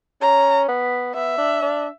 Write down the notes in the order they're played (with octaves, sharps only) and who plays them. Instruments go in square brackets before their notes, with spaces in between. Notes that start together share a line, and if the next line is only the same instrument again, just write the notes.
[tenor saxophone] C#4 [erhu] A#5
[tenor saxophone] B3
[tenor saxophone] B3 [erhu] E5
[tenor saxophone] D4
D4